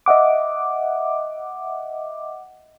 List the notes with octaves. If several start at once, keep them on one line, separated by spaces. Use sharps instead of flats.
D#5 E5 F#5 D6